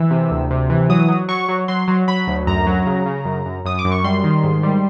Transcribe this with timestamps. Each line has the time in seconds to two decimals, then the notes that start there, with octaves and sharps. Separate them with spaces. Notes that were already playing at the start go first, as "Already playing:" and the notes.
Already playing: E3 E6
0.11 C3
0.31 D2
0.51 C3
0.70 E3
0.89 F#3 D#6
1.09 F#3
1.29 F#3 C#6
1.48 F#3
1.68 F#3 C6
1.88 F#3
2.08 F#3 B5
2.27 D2
2.47 F#2 A#5
2.67 F#3
2.86 C#3
3.06 C#3
3.25 F#2
3.46 F#2
3.65 F#2 D#6
3.79 D6
3.85 F#2
3.92 C#6
4.04 G3 C6
4.24 D#3
4.44 G#2
4.63 G3